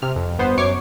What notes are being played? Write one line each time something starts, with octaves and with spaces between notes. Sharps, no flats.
C3 F6
F2
G1 B3 C5
F#2 C#5 C#6 D6 C7